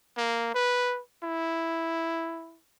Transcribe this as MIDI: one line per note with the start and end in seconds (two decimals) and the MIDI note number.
0.17 0.53 58
0.54 1.00 71
1.23 2.58 64